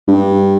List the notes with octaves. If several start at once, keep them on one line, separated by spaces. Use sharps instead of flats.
G2